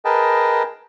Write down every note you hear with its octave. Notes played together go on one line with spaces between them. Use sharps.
G#4 A#4 B4 D#5 G5 A5